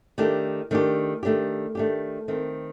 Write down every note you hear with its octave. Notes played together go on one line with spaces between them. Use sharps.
D#3 A3 D4 G4
D#3 A3 D4 G4
D#3 A3 D4 G4
D#3 A3 D4 G4
D#3 A3 C4